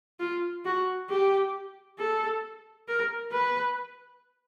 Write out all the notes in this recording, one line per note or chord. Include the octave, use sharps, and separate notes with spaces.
F4
F#4
G4
A4
A#4
B4